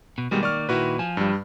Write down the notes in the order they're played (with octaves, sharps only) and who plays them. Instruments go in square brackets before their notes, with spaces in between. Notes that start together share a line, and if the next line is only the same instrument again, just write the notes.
[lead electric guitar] B2
[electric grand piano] B2 G3 G#3 [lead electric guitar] D#3 A#3
[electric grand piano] D5 C#6 F6
[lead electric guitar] A#2 D#3 [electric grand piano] E4 F#4 B4
[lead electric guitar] F3 [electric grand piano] G#5
[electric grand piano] G2 G3